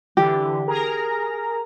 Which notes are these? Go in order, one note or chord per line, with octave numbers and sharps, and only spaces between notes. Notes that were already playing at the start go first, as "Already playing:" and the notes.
D3 E3 G4
G#4 A#4 A#5